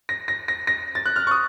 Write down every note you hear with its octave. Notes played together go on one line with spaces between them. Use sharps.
A#6
A#6
A#6
A#6
A6
F#6
F6
C#6
D#6